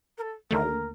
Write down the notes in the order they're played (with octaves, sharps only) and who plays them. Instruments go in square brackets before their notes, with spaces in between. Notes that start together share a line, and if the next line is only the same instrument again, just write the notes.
[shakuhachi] A#4
A4
[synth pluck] D#2 D3 A3 [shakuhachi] A#4